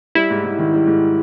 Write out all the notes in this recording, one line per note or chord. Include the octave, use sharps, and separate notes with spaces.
G3 E4
G#2
G#2
D#3
G3
G#2